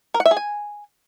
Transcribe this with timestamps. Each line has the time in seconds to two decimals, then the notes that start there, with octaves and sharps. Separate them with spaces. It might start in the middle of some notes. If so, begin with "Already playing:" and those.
0.14 A#4
0.20 F#5
0.26 E5
0.31 G#4
0.37 G#5